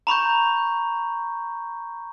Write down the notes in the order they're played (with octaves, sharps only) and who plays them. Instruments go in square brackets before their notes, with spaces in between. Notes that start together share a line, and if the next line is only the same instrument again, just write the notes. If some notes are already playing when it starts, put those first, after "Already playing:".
[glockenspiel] A#5 B5 C#6 G6